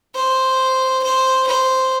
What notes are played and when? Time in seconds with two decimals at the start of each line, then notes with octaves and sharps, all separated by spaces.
0.16 C5
1.04 C5
1.47 C5